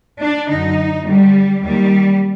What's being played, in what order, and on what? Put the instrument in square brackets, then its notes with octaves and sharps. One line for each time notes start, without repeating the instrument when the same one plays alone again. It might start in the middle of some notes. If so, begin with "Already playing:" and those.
[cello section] D4
F#2 D3 D#4
G2 D3 G3
D#2 D#3 G3